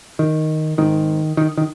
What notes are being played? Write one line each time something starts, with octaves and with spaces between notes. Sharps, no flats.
D#3
G#1 G#2 D#3
D#3
D#3